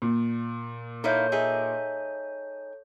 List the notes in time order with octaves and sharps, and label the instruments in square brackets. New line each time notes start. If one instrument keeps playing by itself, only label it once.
[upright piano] A#2
[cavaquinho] D#4 E4 F5 [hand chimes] A4 C#5 G6
[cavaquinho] D#4 G#4 E5